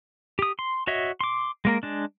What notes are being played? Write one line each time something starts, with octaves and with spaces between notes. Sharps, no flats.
G4 D#6
C6
F#4 C#5 D#5 E5
C6 D6
G#3 A#3 A#4
G#3 D4